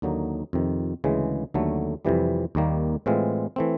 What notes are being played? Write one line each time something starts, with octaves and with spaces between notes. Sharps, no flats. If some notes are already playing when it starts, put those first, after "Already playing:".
D#2 D3 F#3 A#3 D#4
F2 C3 D#3
D2 C#3 E3 G#3
D#2 D3 F#3 A3
F2 C3 E3 G3
D#2 D#3 G3 A#3
A2 E3 G#3 C4 F4
E3 A3 C4